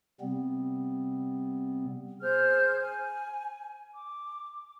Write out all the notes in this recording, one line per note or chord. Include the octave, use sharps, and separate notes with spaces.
C3 G3 B3 C4
G#4 C5 F6 G6
G#5
D6